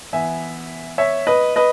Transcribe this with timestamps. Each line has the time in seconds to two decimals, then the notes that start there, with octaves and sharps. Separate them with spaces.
0.13 E3 B3 E5 G#5
0.98 C#5 E5
1.27 B4 D#5
1.56 B4 D#5